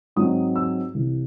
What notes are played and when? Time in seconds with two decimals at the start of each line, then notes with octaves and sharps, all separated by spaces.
0.16 G#2 F#3 C4 D#4 D#6
0.56 E6
0.94 C2 C3 E3